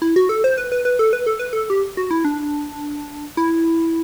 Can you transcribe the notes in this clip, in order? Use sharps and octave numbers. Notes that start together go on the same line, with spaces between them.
E4
F#4
A4
C5
B4
B4
B4
A4
B4
A4
B4
A4
G4
F#4
E4
D4
E4